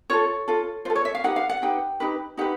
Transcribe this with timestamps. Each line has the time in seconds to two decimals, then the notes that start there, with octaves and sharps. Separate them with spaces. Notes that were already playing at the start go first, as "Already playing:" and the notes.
0.10 F4 A4 C#5
0.48 F4 A4
0.85 F4 A4 C5
0.95 C#5
1.05 E5
1.15 F5
1.24 D#4 G4 B4 F#5
1.36 F5
1.49 F#5
1.62 D#4 G4 B4 G5
2.00 D#4 G4 B4
2.37 D#4 G4 B4 F#5